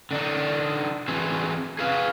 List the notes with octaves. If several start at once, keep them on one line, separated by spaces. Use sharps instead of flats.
D3 D4 D#4
E3 C4 E4 F#4 G#4
G#4 B4 F5